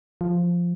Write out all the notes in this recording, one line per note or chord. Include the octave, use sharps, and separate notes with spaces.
F3